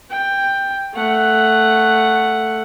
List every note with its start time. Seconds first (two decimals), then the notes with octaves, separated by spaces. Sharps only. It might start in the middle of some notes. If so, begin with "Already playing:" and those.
0.11 G5
0.94 A3 F#5